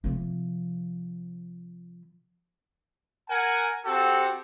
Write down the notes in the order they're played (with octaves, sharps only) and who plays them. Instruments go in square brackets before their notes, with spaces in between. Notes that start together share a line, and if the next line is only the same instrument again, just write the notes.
[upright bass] C3 F3
[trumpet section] A#4 F#5 G#5
C4 F#4 G4 A4